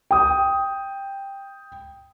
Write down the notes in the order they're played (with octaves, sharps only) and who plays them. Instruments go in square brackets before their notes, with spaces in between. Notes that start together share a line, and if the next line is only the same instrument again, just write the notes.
[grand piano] G5 D#6